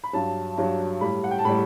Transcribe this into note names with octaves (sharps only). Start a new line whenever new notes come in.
B5
G2 F#3 A5
G2 F#3
A2 G3 B5
F#5
G5
A5
A2 G3 B5